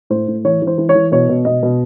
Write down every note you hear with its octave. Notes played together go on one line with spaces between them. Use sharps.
A2 C5
A2
E3 C#5
E3
C5
E3
C#5
E3
B2 C#5
B2
B2 D#5
B2